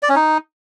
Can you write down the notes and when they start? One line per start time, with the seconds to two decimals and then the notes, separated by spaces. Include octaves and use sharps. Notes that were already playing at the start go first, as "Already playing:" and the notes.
0.03 D5
0.09 C#4
0.16 D#4